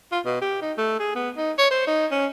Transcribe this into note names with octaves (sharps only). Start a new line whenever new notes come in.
F4
B2
G4
D#4
A3
G#4
B3
D#4
C#5
C5
D#4
C#4